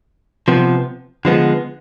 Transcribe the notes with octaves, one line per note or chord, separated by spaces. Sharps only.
C3 F3 B3
D3 F3 G#3 B3